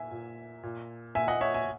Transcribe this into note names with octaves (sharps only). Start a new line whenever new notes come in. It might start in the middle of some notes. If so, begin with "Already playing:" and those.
Already playing: A#2 E5 G#5
A#2
A#2
A#2 E5 G#5
D#5 F#5
C#5 E5
E5 G#5